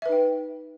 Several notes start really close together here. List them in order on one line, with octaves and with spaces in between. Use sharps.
E5 B4 D#4 G5